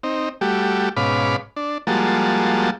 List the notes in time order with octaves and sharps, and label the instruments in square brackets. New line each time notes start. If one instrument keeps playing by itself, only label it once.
[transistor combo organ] C4 D#4
G3 A3 F#4 G4
G#2 B2 C#4 F5 B5 D6
D4
F3 G3 G#3 A#3 F#4 A5